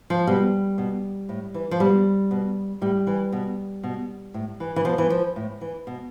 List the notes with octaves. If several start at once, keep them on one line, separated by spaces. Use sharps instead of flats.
F3
B2 G3
B2
A2
E3
F3
B2 G3
B2
A2 G3
E3
B2
B2
A2
E3
E3
B2 F3
E3
F3
A2
E3
B2